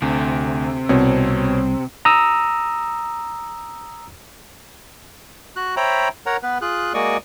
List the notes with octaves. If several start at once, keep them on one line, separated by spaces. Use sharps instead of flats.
D2 C3
C2 B2 C4 C#5
A#5 D#6 E6
F#4 F#6
C5 C#5 E5 G5 A#5 B5
A#4 C#5 F#5 A#5
B3 B4
F4 G#4 F#6
G#3 A#3 F#4 D5 C#6 D#6